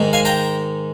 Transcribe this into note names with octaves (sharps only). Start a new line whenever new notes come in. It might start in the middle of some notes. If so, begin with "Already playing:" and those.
Already playing: G#2 D#3 G#3
F5 G#5
G5 A#5